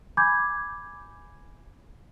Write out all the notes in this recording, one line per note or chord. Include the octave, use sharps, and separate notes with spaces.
G#5 B5 D6 G6 G#6